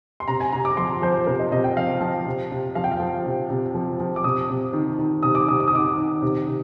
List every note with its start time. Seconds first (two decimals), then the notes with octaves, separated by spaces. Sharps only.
0.20 C6
0.28 C3 A#5
0.40 G#5
0.53 C3 A#5
0.65 D6
0.77 F3 C6
1.02 F3 C5
1.14 C5
1.27 C3 A#4
1.39 D#5
1.51 C3 D#5
1.64 G5
1.77 F3 F5
2.01 F3
2.26 C3
2.51 C3
2.75 F3 F5
2.84 G5
2.92 F5
3.00 F3
3.26 C3
3.50 C3
3.75 F3
4.00 F3
4.16 D6
4.24 C3 D#6
4.50 C3
4.73 D#3
4.99 D#3
5.23 C3 D#6
5.35 D6
5.48 C3 D#6
5.60 D6
5.68 D#6
5.73 D#3 D6
5.98 D#3
6.22 C3
6.47 C3